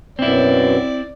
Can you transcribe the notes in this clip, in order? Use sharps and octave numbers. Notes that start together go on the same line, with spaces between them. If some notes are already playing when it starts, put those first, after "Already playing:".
F#2 B2 C4 E4 D5